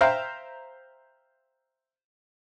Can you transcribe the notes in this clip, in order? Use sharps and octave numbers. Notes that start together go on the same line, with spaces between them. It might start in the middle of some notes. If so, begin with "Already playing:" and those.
C5 E5 F5 G5 A#5